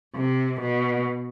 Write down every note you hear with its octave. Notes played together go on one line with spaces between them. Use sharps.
C3
B2